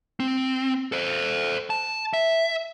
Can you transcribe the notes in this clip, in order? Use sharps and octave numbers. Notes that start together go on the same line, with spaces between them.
C4
A4 C5
A5
E5